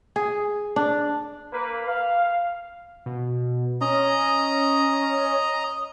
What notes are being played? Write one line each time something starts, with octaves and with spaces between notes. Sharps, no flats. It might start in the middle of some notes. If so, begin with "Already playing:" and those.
G#4
D4
A#3 B4
F5
B2
C#4 D#5 A#5